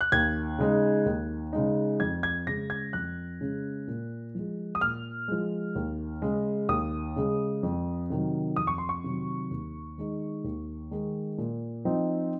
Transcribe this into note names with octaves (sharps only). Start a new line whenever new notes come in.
F#6
D#2 G#6
C#3 G#3 D#4
D#2
C#3 G#3 D#4
F2 G#6
G#6
C#3 G#3 C#4 A#6
G#6
F2 F#6
C#3 G#3 C#4
A#2
F3 G#3
D#6
A#2 F6
F3 G#3
D#2
C#3 G#3
D#2 D#6
C#3 G#3
F2
C3 D#3 F#3
F2 D#6
C#6
C6
C#6
C3 D#3 F#3
D#2
D#3 G#3 D#4
D#2
D#3 G#3 D#4
A#2
F3 C4 D#4